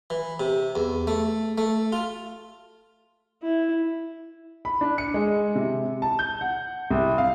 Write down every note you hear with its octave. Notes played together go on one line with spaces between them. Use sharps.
E3
C3
E2
A3
A3
F4
E4
B5
D4
C#7
G#3
C3
A5
G6
F#5
C2
F5